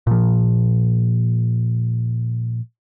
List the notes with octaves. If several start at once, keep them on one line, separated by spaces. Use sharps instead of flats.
A#2 F3